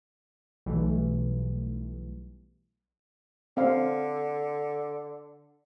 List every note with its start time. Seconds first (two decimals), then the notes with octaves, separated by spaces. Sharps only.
0.66 B1 E3 G3 A3
3.57 D3 C4 F5